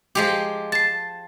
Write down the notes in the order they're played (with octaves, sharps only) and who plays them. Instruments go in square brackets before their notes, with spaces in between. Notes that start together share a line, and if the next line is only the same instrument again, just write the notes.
[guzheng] F3 G#3 G4
[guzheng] A5 [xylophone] A6 C7